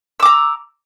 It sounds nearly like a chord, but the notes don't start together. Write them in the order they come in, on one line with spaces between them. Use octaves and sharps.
E6 D6 A#5